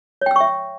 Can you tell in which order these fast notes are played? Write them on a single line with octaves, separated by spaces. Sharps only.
C#5 G5 E6 C#6 E5